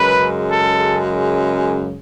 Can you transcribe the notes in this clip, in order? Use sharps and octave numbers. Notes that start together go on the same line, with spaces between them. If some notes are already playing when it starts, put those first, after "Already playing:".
Already playing: F#2 C#3 G#3 B4
A4